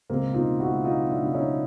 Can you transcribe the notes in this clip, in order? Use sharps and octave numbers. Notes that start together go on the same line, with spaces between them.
C#2 A#3 C4
B2
D#4 F4
C#2
E4 F#4
C#2
F#3 D#4 F4
B2
D4 E4
C#2 E4
C#4 D#4
F#3